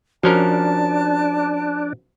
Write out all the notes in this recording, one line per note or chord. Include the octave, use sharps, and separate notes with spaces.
F3 C#4 D4 F#4 A#4 A5